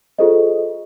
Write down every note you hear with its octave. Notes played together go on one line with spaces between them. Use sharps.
F4 G#4 A4 C5 D#5